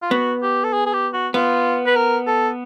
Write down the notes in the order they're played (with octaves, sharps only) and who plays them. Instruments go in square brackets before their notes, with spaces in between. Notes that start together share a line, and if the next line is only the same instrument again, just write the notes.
[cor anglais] F4
[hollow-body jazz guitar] B3 [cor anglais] F#4
[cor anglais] G4
A4
G#4
G#4
G4
F#4
[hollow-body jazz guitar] B3 [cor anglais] F4
[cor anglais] B4
A#4
A4